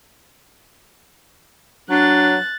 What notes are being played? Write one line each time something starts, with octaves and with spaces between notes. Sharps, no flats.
F#3 D4 F#6 A6